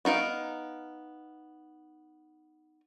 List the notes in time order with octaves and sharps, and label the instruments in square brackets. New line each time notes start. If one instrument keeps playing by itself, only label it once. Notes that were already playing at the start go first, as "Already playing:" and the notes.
[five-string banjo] B3 D#4 A#4 F5